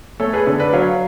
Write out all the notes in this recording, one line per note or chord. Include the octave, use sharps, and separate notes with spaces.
A3 A4 C#5
G#4 B4
D3 A4 C#5
B4 D5
F#3 C#5 F5